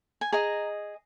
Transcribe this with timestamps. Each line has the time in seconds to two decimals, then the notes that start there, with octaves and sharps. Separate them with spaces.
0.21 G#5
0.32 G#4 D#5 A#5